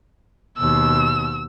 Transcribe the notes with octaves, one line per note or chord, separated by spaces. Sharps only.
D#2 B2 E6